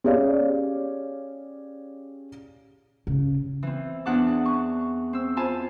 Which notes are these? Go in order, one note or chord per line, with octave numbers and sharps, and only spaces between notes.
C#4 G4 G#4 C#5 D5 F5
C#3
E3 C4
E2 D4 F#5 A5 D6
C#6
C4 E6
F4 C5 G#5 A5 B5